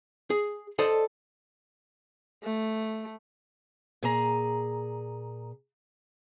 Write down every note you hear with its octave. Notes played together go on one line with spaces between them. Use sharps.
G#4
A4 C5 D5 D#5
A3
A#2 G#4 A#5